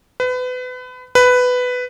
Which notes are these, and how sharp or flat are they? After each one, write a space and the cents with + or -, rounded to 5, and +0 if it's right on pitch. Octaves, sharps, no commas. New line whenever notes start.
B4 +30
B4 +10